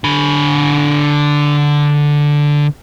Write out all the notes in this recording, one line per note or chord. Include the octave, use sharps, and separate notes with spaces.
D3 B5